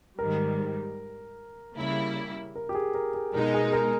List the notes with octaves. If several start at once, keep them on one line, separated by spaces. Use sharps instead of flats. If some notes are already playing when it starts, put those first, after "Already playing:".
G#2 D#3 G3 A#4
C#3 G3 A#3 E4
A#4
G4
G#4
A#4
G#4
B2 G#3 D#4 A#4
G#4
A#4